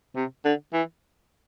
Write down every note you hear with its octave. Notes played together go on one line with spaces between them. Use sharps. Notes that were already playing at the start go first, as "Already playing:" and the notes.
C3
D3
E3